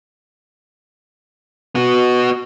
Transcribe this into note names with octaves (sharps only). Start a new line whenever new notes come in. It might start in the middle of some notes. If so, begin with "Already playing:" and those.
B3 F#4